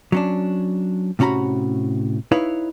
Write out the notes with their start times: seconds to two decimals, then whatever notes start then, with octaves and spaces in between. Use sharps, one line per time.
0.12 F#3 C#4 D4
1.19 A2 C3 C#4 F#4 A#5 B5
2.32 D#4 E4 B4 C#5 F5